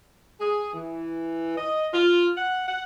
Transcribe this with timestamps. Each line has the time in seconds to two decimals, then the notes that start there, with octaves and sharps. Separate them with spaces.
0.40 G#4
0.73 E3
1.57 D#5
1.93 F4
2.37 F#5
2.67 F#5